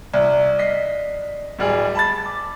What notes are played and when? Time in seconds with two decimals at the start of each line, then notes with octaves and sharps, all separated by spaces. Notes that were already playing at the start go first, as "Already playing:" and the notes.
0.14 C2 D5
0.59 D#5 B6 C7
1.59 D1 G3 G#4
1.95 A5 B5 A6
2.26 D6